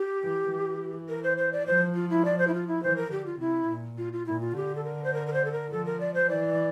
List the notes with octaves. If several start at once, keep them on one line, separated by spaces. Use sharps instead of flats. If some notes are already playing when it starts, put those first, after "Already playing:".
Already playing: G4
E3
E3
A#4
C5
C5
D5
F3 C5
F4
E4
D5
C5
E4
F4
E4
E3 C5
A#4
D3 G4
F4
C3 E4
A#2
F4
F4
A#2 E4
F4
D3 G4
A4
A#4
C5
A#4
A#4
C5
A4
A#4
F3 A4
A#4
D5
C5
E3 D5